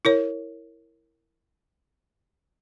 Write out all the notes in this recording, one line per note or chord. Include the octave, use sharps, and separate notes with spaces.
E4 A#4 C#5